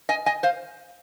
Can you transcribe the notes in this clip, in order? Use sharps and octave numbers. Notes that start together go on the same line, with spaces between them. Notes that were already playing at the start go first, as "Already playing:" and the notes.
D#5 G#5
D#5 G#5
C5 F5